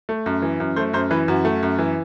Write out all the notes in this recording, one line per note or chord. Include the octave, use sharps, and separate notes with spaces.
A3
F#2
E3
F#2
A3 C5
F#2 C5
E3 B4
F#2 F#4
A3
F#2
E3